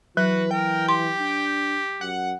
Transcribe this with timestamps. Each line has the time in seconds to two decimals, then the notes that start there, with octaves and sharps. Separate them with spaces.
0.17 E3 F#3 F#4 B4
0.51 A#4 G5
0.89 G4 C6
1.20 D4
2.01 F#2 F#5